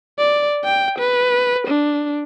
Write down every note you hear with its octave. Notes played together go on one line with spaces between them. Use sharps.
D5
G5
B4
D4